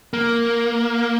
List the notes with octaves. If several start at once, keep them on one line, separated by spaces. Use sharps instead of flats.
A#3